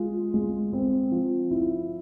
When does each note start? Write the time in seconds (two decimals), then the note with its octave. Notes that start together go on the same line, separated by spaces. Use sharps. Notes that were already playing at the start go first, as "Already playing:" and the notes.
Already playing: G#3 F4
0.34 G#3
0.73 C4
1.12 F3
1.51 E4